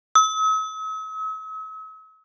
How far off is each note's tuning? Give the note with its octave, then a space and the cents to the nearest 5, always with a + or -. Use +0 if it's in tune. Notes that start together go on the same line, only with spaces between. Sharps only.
E6 -45